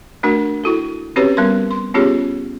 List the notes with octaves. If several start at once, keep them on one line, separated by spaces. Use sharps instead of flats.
A3 D4 F#4 A#4
E4 F#4 A4
C4 C#4 F#4 G4 B4 C#5
G3 B3 A#4 C6
C6
B3 C#4 F4 G4 G#4 C#5